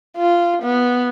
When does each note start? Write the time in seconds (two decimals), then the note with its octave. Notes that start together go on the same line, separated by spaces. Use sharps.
0.17 F4
0.62 B3